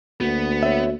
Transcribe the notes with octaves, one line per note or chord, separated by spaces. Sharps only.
D2 A#3 B3 F#4
C#5 E5